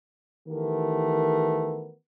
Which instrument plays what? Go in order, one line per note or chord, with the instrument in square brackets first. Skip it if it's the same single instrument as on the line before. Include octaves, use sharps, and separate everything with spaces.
[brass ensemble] D#3 E3 A3 B3 G4 A#4